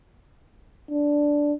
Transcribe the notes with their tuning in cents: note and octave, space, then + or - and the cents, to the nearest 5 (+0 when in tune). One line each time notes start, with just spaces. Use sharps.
D4 -5